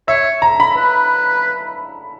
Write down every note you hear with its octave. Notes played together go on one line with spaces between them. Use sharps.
C#5 E5
A#5
B5
B4